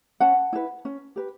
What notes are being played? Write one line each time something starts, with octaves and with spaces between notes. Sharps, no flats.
C#4 F#5 A5
E4 B4
C#4
G4 B4